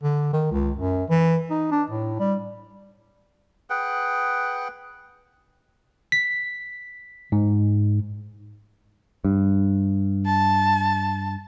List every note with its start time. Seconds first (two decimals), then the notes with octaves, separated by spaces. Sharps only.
0.03 D3
0.33 D#3
0.51 C#2
0.76 F#2
1.10 E3
1.51 D#4
1.71 D4
1.90 A2
2.20 G3
3.70 G#4 B4 F#5 G5
6.12 B6
7.32 G#2
9.24 G2
10.27 A5